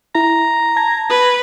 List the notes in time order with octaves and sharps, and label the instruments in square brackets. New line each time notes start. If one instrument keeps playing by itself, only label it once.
[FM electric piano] E4 [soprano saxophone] A#5
[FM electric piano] A5 G#6 A#6
[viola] B4